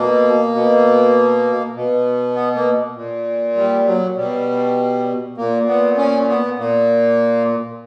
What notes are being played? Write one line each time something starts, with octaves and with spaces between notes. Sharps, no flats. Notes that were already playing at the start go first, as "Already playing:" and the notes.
Already playing: B2 A#3
B2
B2
B3
A#3
A#2
G3
F#3
B2 G3
A#2 A#3
B3
C#4
B3
A#2 A#3